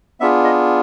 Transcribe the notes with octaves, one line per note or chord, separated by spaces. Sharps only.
B3 D4 F4 G#4 E5
D#5